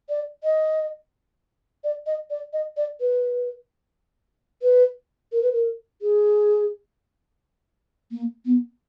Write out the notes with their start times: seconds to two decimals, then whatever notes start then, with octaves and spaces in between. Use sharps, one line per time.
0.09 D5
0.44 D#5
1.84 D5
2.06 D#5
2.30 D5
2.53 D#5
2.77 D5
3.00 B4
4.62 B4
5.32 A#4
5.42 B4
5.53 A#4
6.02 G#4
8.11 A#3
8.46 B3